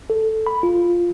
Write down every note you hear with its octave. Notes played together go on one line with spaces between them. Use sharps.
A4
B5
F4